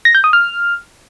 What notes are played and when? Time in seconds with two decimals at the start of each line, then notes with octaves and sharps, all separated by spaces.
0.05 A#6
0.15 G6
0.24 D#6
0.33 F6